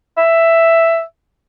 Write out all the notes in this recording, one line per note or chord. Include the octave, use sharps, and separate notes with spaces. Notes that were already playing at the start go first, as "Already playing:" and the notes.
E5